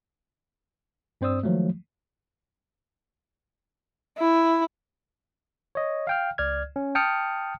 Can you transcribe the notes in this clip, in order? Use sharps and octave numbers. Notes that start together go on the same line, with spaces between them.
G2 C4 C5 D5 D#6 E6
D#3 F3 F#3 G#3 A3
E4
C#5 D#5
F5 G5 F6
C#2 D5 F6 G#6
C#4
G5 A5 D#6 F6 C#7